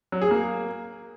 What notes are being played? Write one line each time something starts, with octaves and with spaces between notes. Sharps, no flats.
F#3
G#4
A#3